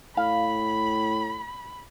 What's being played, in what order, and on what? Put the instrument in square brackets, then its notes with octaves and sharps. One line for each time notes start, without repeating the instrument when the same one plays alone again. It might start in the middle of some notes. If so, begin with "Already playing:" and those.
[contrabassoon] A2 [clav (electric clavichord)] F5 [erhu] B5